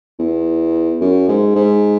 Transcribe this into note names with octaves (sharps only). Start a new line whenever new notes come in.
E2
F#2
G#2
G#2